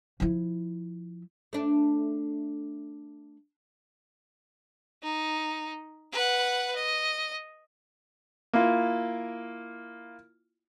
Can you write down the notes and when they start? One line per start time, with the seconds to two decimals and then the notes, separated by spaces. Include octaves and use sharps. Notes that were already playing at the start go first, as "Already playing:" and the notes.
0.20 F3 E4
1.53 A3 D4
5.03 D#4
6.12 B4 F#5
6.75 D#5
8.53 A#3 E4 F4